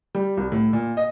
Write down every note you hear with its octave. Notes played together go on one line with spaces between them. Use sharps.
G3
C2
A2
A#2
D#5